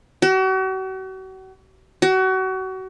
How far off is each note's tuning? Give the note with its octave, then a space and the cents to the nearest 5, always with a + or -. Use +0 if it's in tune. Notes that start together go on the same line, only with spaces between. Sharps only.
F#4 +40
F#4 +30